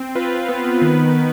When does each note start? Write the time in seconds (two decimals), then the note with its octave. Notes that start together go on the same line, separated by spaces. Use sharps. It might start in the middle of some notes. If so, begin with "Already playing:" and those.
Already playing: C4
0.15 F4 B4
0.49 B3
0.82 D#3
1.15 D#3